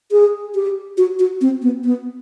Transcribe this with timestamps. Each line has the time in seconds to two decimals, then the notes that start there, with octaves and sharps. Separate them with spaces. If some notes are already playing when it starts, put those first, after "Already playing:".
0.12 G#4
0.55 G4
0.98 F#4
1.19 F#4
1.41 C4
1.62 B3
1.84 B3